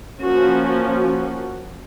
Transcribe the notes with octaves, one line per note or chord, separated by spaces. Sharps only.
F3 A#3 C#4 F#4
F#4